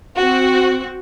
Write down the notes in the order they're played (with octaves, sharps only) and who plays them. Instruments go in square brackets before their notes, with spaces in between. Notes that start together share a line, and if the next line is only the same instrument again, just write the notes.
[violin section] C4 F#4